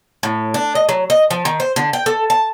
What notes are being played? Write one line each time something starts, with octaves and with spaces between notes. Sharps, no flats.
A2
D4
D#5
F#3
D#5
F3
D#3
C5
D3
G5
A4
A5